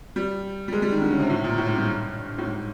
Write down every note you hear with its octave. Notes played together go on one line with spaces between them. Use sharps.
G3
G3
G#3
G3
D#3
D3
C#3
C3
A2
A#2
A2
G#2
G2
A2
G#2